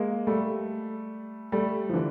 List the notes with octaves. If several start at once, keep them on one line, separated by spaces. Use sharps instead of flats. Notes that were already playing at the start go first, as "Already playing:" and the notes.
Already playing: G#3 A#3
G3 A3
G3 A3
F3
D3 E3